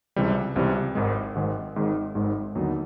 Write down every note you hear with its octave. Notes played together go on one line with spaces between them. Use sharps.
C#2 C3 E3 G3
C#2 C3 E3 G3
G#1 G#2 D#3 G#3
G#1 G#2 D#3 G#3
G#1 G#2 D#3 G#3
G#1 G#2 D#3 G#3
D#2 D3 F#3 B3 D#4